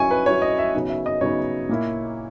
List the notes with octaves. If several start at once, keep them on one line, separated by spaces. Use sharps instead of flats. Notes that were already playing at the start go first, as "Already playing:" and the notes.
Already playing: F#3 C#4 E4 G#5 C#6
B4
F#3 C#4 E4 C#5
D#5
E5
C#3 F#3 B3 D#4
E5
D#5
C#3 F#3 B3 D#4 C#5
A#2 A#3 E4